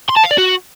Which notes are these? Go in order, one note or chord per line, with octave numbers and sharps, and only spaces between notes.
C6
A5
F5
D5
F#4